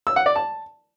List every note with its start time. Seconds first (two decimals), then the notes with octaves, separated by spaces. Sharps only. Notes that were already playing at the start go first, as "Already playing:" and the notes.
0.07 E6
0.16 F#5
0.26 D5
0.36 A5